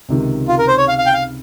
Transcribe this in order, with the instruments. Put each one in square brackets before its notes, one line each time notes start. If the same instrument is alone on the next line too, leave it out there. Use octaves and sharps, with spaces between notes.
[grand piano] C#2 C3 D#3
[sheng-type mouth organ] F4
A#4
C5
C#5
F5
F5
G5
F5